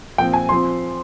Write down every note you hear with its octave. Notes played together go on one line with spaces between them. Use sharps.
A#2 F3 C4 G5
G#5
F3 C4 C6